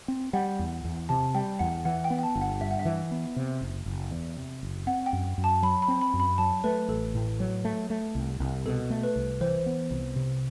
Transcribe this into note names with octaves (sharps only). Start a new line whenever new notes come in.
C4
G3 F#5
E2
E2
C3 A5
G3 G5
E2 F#5
E3 F#5
G5
B3
G5
A5
G1
F#5
G2 E5
F#5
E5
E3
B3
C3
F#1
F#1
E2
C3
F#1
C4 F#5
G5
F#2
F#2
A5
F#3 B5
B5
C4
B5
F#2
B5
F#3 A5
A3 B4
A1 A4
A2
F#3
A3
A3
C2
C2
B2 A4
A3
B4
C2
E3 C5
B3
C2
C3